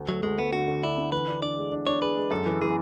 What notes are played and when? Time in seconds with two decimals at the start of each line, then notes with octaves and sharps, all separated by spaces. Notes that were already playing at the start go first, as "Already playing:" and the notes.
Already playing: D2
0.09 F#3 A3
0.23 D2 G#3
0.38 A3 B3
0.53 D3 F#4
0.68 D3
0.83 D4 E4
0.98 D3
1.12 E3 B4
1.27 D4
1.42 D4 D5
1.57 G#3
1.72 D4
1.87 D4 C#5
2.02 G#4 B4
2.16 G#3
2.31 F#2 A4
2.46 E3
2.62 E3 G#4